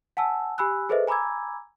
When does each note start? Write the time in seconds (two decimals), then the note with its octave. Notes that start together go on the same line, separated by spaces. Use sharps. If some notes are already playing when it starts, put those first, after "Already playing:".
0.17 F#5 G#5 A5 E6
0.58 G4 G#5 B5 E6 F#6
0.89 G#4 A4 B4 C5 D#5 E5
1.08 G#5 A#5 B5 D6 E6 G#6